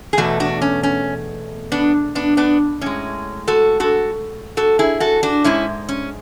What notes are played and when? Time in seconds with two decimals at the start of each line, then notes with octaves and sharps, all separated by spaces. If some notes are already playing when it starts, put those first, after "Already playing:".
0.13 G#4
0.18 E2 B2 A3 F#4 A4
0.40 D4 F#4
0.62 C#4
0.83 C#4
1.72 B3 D4
2.15 B3 D4
2.37 B3 D4
2.81 A2 G#3 C#4
3.48 F#4 A4
3.80 F#4 A4
4.57 F#4 A4
4.79 E4 G#4
5.00 F#4 A4
5.23 D4 F#4
5.44 G#2 G#3 C#4 E4
5.89 C#4